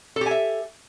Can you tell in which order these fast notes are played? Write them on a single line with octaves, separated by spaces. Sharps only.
A4 G4 G#5 E5